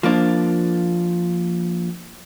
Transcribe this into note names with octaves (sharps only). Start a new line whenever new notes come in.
F3 A#3 D4